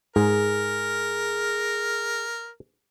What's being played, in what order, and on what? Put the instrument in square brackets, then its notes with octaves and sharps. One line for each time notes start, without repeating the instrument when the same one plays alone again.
[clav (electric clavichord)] G#2 [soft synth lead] G#4 [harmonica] A#4